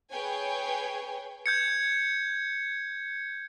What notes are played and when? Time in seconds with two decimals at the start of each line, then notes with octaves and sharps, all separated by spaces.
0.11 G#4 B4 C#5 G5 G#5
1.46 G6 G#6 C#7